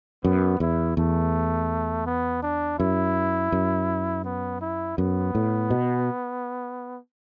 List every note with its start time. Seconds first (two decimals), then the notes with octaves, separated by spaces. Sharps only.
0.24 F#2 B3
0.60 E2 E4
0.97 E2 A3
2.06 B3
2.42 D4
2.79 F#2 E4
3.52 F#2
4.25 B3
4.61 E4
4.97 F#2 B3
5.35 A2
5.70 B2